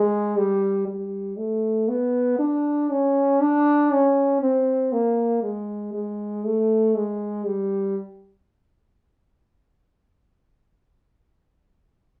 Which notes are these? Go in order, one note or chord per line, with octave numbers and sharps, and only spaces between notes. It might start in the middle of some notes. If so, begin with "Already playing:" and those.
Already playing: G#3
G3
G3
A3
B3
D4
C#4
D4
C#4
C4
A#3
G#3
G#3
A3
G#3
G3